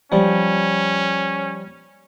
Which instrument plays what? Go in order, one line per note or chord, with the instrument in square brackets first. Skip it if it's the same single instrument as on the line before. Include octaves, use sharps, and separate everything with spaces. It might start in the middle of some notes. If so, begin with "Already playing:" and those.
[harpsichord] F3 G3 [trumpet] C#4